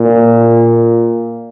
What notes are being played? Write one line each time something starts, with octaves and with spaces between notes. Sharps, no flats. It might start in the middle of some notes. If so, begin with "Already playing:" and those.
Already playing: A#2